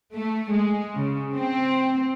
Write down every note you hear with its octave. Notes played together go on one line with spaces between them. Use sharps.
A3
G#3
C#3
C4